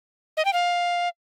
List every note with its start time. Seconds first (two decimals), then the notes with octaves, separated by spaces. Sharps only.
0.37 D#5
0.45 G5
0.53 F5